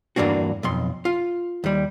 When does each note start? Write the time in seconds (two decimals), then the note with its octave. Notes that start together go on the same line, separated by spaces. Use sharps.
0.16 E2 G2 E3 A#3 D4 F#4
0.63 B1 F2 C6
1.05 F4
1.64 D#2 G3